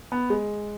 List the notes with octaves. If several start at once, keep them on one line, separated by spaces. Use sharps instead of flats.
B3
G#3